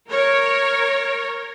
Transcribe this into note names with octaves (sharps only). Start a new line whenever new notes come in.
A#4 C#5